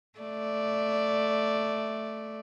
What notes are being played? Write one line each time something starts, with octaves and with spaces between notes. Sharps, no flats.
A3 D5